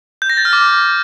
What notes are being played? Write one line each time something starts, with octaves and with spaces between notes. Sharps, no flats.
G6
A#6
A6
F6
D6